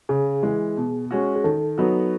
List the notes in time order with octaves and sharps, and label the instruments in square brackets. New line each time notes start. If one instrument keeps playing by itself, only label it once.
[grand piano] C#3 [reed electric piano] G#4
[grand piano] E3 G#3
B2
G#3 C#4 F#4
[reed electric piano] G#4
[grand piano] D#3 [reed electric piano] A4
[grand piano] F#3 B3 D#4 F#4